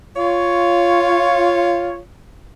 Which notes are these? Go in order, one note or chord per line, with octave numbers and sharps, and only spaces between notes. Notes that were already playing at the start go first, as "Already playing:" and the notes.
F4 C#5